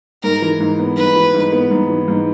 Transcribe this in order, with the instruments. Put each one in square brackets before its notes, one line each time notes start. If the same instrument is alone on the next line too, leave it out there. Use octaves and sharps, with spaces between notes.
[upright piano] G#2 [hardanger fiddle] A#4
[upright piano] E3
G#2
B3
[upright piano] G#2 [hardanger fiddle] B4
[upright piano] E3
G#2
B3
G#2
E3
G#2